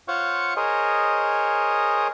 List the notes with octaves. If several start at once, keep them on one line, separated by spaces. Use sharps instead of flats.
F4 C5 C#5 F5 F#5 C#6
G#4 A#4 C5 C#5 D#5